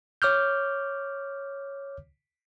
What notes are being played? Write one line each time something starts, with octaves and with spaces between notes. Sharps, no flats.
C#5 D6 F6 G6